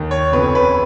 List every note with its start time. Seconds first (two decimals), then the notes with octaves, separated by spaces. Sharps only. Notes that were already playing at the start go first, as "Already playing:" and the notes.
Already playing: D#2 D#3
0.11 C#5
0.32 F1 F2 C#3 B4
0.43 C#5
0.55 B4